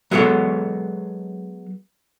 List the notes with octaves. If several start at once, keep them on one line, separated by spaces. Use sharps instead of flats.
F#3 G#3 B3 A4 C#5